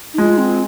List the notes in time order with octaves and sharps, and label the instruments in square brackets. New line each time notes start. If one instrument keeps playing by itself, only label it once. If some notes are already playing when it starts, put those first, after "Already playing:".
[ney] D#4
[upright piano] G#3 [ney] F4
[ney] C4